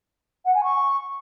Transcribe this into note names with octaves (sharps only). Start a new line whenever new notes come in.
F#5
G#5
C#6